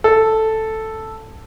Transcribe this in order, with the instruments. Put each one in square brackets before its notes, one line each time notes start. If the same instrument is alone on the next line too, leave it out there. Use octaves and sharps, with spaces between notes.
[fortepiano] A4